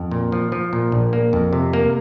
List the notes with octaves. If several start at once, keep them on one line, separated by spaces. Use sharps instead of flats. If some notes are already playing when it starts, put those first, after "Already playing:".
Already playing: F2
A#2
F3
F3
A#2
A#1
A#3
F2
C3
A#3